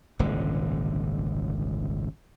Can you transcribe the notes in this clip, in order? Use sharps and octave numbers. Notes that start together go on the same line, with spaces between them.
D#1 G#1 C#2 D3